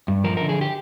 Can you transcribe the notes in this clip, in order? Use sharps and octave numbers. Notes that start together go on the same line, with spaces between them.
G2
F3 A#4
D3 A#4
G#4
G4